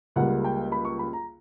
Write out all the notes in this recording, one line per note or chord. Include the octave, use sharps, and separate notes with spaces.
C#2 C#3 G3 A#3 F#5
G5
B5
C#6
B5
A#5